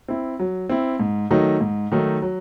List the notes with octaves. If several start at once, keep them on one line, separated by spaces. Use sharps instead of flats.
C4 E4
F#3
C4 E4
G#2
D#3 F#3 A3 D#4
G#2
D#3 F#3 A3 D#4
F#3